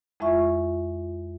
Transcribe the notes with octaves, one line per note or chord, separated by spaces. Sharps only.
F2 G#3 E4 F4 E5 C#6